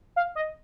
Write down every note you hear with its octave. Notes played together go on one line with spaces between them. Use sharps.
F5
D#5